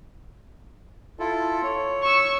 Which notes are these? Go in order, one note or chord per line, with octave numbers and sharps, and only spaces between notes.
E4 F4 A4
C#5
C#6 E6